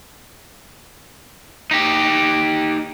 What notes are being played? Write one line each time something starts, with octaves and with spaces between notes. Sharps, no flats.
D#4 G4